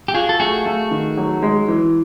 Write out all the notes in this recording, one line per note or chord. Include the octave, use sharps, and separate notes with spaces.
G4
F4 F#4 G#4
A4
A3 F#4 G#4
A3
D#3
F#3
G#3
E3